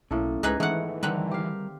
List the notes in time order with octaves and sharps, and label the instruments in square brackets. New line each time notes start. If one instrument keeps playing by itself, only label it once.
[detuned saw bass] B1 [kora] A2 A#3 A4 [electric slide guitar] C#4
[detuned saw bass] C#2 [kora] G#2 [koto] D#4 G#4 B4
[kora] G#2 A3 B3 [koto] D#3 F#5 [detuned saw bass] E3
[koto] D3 D#3 B4 [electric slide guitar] G3 A#4 [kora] C4
[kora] G4 F5